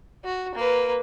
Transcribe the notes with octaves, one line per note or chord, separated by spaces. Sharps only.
F#4
A#3 B4